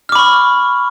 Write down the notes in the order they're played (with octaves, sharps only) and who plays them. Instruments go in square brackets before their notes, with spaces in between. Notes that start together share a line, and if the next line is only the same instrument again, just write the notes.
[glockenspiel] F6
D6
B5
C#6